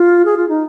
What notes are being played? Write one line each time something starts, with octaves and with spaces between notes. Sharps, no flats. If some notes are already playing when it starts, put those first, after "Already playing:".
Already playing: F4
G#4
F4
D#4